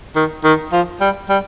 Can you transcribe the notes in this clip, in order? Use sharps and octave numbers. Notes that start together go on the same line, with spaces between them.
D#3
D#3
F3
G3
G3